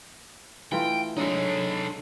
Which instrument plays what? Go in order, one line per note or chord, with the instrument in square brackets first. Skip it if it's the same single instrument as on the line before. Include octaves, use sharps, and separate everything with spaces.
[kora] E3 A3 F4 [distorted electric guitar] G5
[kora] D3 G#3 [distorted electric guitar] D#4 A4 [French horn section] C#5